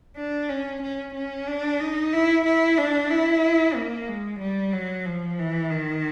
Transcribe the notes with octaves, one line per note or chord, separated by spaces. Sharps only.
D4
C#4
C#4
C#4
D4
D#4
E4
E4
D4
E4
A#3
G#3
G3
F#3
F3
E3
D#3